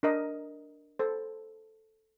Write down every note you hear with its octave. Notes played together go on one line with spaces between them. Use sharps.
D4 A#4 D#5
A4 C5